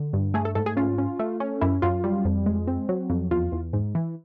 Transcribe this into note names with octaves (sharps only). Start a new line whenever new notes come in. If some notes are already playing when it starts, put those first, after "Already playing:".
Already playing: D3
G2
A3 G#4
A4
G#2 A4
G#4
C#4 F4
C#4
A3
C#4
F#2 E4
F#2 F4
G3
F2
G#3
C4
F#3
F2
E2 F4
E2
G#2
E3